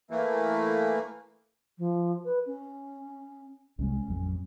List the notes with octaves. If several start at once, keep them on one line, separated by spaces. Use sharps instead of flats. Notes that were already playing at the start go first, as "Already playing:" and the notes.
E3 A3 A#3
F3
B4
C#4
C2 C3 G#3 C#4
A1 F2 F#3